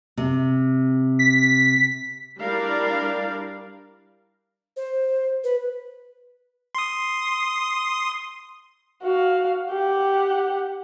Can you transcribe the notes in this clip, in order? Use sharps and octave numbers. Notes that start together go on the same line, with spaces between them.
C3
B6
G3 D4 E4 A#4 D5 F5
C5
B4
C6 D#6
F#4 F5
G4 F#5